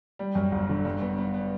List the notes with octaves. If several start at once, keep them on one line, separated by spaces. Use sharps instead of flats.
G3
F#2
G1
D3
G2
B3
B3
B3